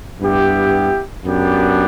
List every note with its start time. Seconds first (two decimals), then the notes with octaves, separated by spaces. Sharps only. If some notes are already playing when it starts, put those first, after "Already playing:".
0.20 G2 B3 E4 G4
1.24 F#2 B3 D4 G4